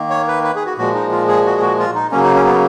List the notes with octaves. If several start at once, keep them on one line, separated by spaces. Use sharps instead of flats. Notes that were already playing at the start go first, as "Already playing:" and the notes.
Already playing: D#3 A#3
C#5
B4
B4
G#4
F#4
A#2 F3 G#3 F#4
D#4
F4
G#4
F#4
G#4
F#4
F4
D#4
C#3 F#3 A#3 C#4
D#4
C#4
B3